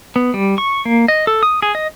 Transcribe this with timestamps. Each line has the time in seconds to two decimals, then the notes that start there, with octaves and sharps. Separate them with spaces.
0.16 B3
0.34 G3
0.58 C#6
0.85 A#3
1.08 D#5
1.27 A4
1.43 D#6
1.62 G#4
1.75 D#5